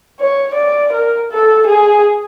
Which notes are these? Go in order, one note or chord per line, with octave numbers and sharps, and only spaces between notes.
C#5
D5
A#4
A4
G#4